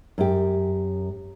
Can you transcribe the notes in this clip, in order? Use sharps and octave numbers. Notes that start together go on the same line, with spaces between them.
F#2 G4